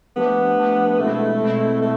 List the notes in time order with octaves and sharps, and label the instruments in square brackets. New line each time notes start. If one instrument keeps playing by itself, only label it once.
[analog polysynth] F3 A3 D4 G4 [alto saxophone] B3
[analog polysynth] F3 A3 D4 G4
[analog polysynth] B2 G#3 C4 E4 [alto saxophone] A3
[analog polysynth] B2 G#3 C4 E4
[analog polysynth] B2 [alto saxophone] A3